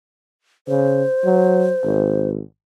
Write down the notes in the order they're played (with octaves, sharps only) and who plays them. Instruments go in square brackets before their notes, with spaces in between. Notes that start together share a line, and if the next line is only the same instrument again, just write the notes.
[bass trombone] C#3 [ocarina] C5
[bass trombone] F#3
G#1